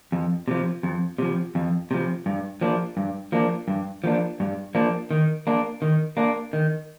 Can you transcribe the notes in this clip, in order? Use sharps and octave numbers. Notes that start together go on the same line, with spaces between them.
F2
C3 F3
F2
C3 F3
F2
C3 F3
G2
F3 A#3 D4
G2
F3 A#3 D4
G2
F3 A#3 D4
G2
F3 A#3 D4
D#3
A#3 D4
D#3
A#3 D4
D#3